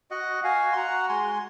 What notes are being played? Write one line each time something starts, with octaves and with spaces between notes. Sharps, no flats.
F#4 D#5 F#5
F#4 F5 G#5
C6
F#4 F#5 A#5
G#3 G#5 C6